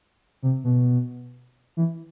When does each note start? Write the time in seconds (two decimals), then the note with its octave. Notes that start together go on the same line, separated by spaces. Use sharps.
0.43 C3
0.64 B2
1.77 E3